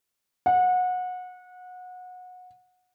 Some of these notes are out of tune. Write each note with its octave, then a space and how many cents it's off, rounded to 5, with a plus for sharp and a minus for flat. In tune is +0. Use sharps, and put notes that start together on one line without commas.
F#5 -25